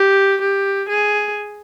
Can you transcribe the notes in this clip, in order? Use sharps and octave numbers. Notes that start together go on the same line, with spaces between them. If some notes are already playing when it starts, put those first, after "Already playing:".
Already playing: G4
G4
G#4